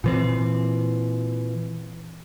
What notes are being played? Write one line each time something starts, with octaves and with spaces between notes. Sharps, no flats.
A#2 E3 C4